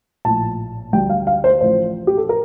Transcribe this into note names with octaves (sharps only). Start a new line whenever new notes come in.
A#1 A2 F3 A5
D2 D3 G3 G5
F5
F5
C5
A1 A2 F3 C5
G4
A4
A#4